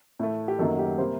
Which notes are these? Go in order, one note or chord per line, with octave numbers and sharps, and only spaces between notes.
A2 A3
G4
F#2 D#3 F#3 A#3 A4
G4
C3 G3 A#3 C5